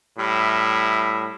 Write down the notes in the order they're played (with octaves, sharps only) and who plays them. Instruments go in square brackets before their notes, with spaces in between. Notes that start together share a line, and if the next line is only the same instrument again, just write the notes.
[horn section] A2 G3 E5